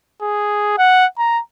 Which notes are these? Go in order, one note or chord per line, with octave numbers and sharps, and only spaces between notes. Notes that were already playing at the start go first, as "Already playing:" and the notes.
G#4
F#5
A#5